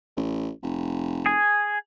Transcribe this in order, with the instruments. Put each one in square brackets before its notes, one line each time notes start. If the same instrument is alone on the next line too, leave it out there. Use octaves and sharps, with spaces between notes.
[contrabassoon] A1
F1
[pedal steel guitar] G#4 G#5